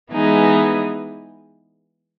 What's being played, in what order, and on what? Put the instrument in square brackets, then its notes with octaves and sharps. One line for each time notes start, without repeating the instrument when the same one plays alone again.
[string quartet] E3 G#3 B3 D#4 G#4